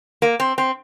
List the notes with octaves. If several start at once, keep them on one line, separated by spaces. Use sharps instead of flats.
A#3
C4
C4